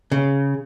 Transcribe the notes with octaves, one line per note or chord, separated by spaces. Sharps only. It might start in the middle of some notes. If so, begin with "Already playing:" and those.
C#3